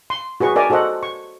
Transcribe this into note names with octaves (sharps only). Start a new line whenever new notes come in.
C6
F#4 G#4 B4 C#6
A#4 D5 E5 G#5 A#5
F#4 A4 C5 D#5 F#5
C#6